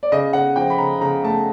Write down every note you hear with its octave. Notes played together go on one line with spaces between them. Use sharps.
D5
C#3 D#5
C#3 F#5
F3 G5
B5
C#3 A#5
C#3 A#5
A3 A5